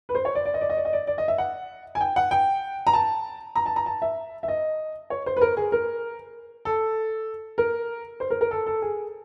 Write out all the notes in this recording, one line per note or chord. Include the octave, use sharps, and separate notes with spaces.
B4
C5
C#5
D5
D5
D#5
D5
D#5
D5
D#5
D5
D5
D#5
E5
F#5
G#5
G5
F#5
G5
A#5
A5
A#5
A5
A#5
A5
E5
E5
D#5
C#5
C5
B4
A#4
G#4
A#4
A4
A#4
C5
A#4
A#4
A4
A4
G#4